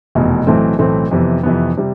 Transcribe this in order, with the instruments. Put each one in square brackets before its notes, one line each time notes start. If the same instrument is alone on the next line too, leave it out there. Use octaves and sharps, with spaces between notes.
[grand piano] F1 E2 B2
B1 A2 E3 A3 C4
B1 A2 E3 A3 C4
F2 C3 E3 B3
F2 C3 E3 B3
C3 G3